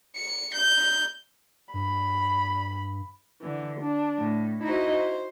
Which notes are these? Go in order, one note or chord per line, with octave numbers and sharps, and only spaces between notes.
C#7
G6
G2 B5
D3 E3
D4
A2
D#4 E4 F#4 C5 D#5
C5